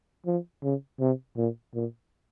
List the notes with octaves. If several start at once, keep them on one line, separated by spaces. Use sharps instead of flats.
F3
C#3
C3
A#2
A#2